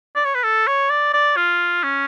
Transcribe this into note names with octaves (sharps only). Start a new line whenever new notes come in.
D5
C#5
B4
A4
C#5
D5
D5
F4
C#4